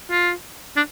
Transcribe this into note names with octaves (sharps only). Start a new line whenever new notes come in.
F4
D4